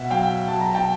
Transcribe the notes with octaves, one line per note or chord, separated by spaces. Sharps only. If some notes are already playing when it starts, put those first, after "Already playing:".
Already playing: B2 E5 F#5
F#3 F5 G5
F#3 A5
A#5
G5 A5